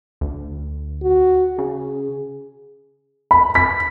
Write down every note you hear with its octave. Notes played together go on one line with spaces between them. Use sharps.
D2
F#4
C#3 G#4
B5
B6